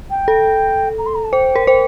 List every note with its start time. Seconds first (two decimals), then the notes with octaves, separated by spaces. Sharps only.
0.10 G5
0.28 A4
0.98 A#5
1.06 C6
1.15 A#5
1.24 A5
1.32 C5 G5
1.56 A#4
1.67 C5 G5